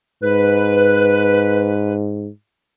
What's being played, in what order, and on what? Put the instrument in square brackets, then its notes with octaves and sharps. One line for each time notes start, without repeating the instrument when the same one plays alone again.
[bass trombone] G#2 [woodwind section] B4